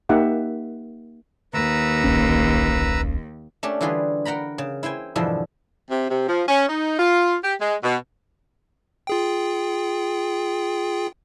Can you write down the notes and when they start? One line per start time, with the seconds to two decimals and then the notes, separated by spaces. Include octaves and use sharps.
0.09 A#3 D#4 G4 E5 F#5
1.54 D#2 B4 A#5 E6
2.04 D1 A#1 C#4
3.63 A3 C#4 D4 G4
3.81 D3 E3 G3 F4 G#4 B4
4.25 A#4 F#5 G5 A#5 B5
4.58 C#3
4.83 E4 C5 G5 G#5
5.16 E2 G2 B2 D3 F3 E4
5.91 C3
6.10 C3
6.28 F3
6.48 C#4
6.69 D#4
6.99 F4
7.44 G4
7.61 G#3
7.84 B2
9.07 F4 G#4 G5